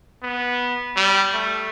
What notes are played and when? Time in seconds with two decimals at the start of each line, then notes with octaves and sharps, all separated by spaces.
0.23 B3
0.96 G3
1.34 A3